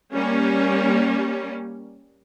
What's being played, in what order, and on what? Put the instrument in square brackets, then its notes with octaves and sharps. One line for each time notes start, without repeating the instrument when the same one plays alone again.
[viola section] G3 A#3 C#4